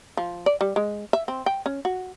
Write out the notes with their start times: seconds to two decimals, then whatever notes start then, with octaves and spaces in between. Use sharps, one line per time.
0.17 F3
0.46 D5
0.61 G3
0.76 G#3
1.13 E5
1.28 C4
1.46 G5
1.66 C#4
1.85 F#4